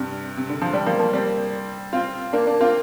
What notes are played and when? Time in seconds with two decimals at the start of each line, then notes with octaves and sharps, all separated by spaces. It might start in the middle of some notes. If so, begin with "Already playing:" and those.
Already playing: G2 C3
0.37 C3
0.50 D3
0.62 F3
0.73 G3
0.86 F3 A#3
0.99 F3 A#3
1.13 G3 C4
1.93 C4 F4
2.33 A#3 D4
2.46 A#3 D4
2.61 C4 F4